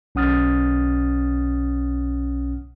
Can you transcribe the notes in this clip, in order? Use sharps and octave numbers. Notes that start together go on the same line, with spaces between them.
B1 C#4 F#5 D#6 F6 A6